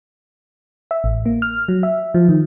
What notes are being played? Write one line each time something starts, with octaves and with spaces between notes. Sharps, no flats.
E5
A1
A#3
F6
F#3
E5
F3
D#3